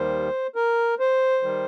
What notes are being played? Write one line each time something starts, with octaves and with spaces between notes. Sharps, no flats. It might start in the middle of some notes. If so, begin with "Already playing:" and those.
Already playing: D#2 D#3 G3 C5
A#4
C5
D#3 G3